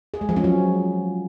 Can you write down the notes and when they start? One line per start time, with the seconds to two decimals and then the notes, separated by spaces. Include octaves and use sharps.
0.14 G#4
0.21 G#3
0.29 F3
0.36 C#4
0.44 F#3